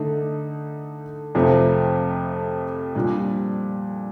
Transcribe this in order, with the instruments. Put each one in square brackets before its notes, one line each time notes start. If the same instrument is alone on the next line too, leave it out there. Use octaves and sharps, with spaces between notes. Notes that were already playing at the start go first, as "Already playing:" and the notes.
Already playing: [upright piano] D3 A3 D#4
F2 C3 F3 A3
A#2 G3 D4